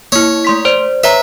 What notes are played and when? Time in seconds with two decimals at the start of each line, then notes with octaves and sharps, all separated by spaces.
0.12 A#3 E4 C#5
0.45 A3 C6 B6
0.65 C5 D5
1.04 B4 C#5 E5 A#5